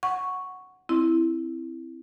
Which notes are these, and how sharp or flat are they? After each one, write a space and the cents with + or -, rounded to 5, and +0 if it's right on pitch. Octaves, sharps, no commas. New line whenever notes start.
F#5 +0 C#6 +0
C4 +0 E4 +0